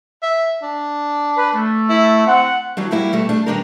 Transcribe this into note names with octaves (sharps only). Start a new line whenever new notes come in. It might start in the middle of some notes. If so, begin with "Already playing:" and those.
E5
D4
B4
A3
E4
C4 F#5
E3 F#3 G3 D4
F#3 G3 A#3 E4 F#4 G4
B2 G3 A3
G3 A3 D4
B2 D#3 G3 D4 G4 A#4